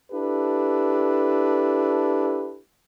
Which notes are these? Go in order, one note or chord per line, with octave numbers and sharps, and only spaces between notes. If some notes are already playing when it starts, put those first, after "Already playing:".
D4 E4 G4 A4 B4